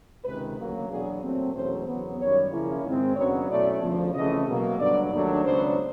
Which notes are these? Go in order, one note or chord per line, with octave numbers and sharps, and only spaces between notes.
C#2 C3 D#3 G#3 B4
D2 C#3 F#3 A#3
E2 B2 F#3 B3 D4 G#4
A#2 F#3 A3 C4
E2 B2 F#3 A3 C#4 C5
E2 C#3 F#3 B3
F#2 D#3 G3 C#5
C#3 F3 A#3 C#4 E4
G#2 D#3 G#3 C4
F#2 C#3 F#3 B3 D4 C#5
B2 F#3 A3 C#4 E4 D5
D2 C#3 F3
C#3 E3 A3 C4 D#5
B2 F#3 A#3
G2 D3 F#3 B3 D5
D#2 D#3 F#3 A3 D4
C#2 C#3 F#3 B3 D4 C5